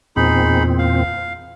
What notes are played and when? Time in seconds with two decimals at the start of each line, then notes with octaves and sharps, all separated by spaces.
0.16 E2 A#2 C4 D#4 G#4 B5
0.78 F5